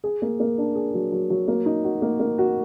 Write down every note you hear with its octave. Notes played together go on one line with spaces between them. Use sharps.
G#4
A#3
A#3
D4
G#4
F#3
F#3
F#3
A#3
D#4
F#4
A#3
A#3
F#4